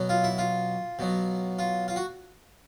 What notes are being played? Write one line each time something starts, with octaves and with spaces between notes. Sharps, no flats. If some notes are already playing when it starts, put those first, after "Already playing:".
Already playing: B2 F#3
F4
E4
F4
B2 F#3
F4
F4
F#4